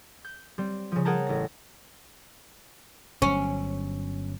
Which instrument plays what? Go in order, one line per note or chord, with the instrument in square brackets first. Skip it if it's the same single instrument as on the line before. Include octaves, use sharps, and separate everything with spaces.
[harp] G6
G3 C4
C#3 F3
G#4 A#4 F#5 G5 A5 A#5
A1 A#6
[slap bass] G1 F#3 [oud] C#4